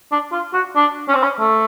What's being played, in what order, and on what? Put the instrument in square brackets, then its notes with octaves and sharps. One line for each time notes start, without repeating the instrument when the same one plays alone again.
[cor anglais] D4
F4
F#4
D4
C#4
C4
C#4
A3